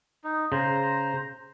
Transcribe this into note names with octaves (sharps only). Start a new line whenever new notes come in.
D#4
C#3 C5 A#5